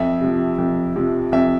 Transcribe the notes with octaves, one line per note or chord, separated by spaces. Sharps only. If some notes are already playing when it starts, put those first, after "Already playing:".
Already playing: F2 E5
C3 F3
F2
C3 F3
F2 E5